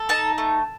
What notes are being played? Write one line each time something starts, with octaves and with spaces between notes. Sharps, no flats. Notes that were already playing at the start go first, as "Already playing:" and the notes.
Already playing: A4
D#4 A5
A3